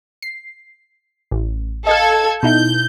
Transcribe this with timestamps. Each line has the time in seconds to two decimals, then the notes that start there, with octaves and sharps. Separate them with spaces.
0.22 C7
1.31 A1
1.87 A4 D#5 F5 G#6
2.43 B2 D#4 E4 G6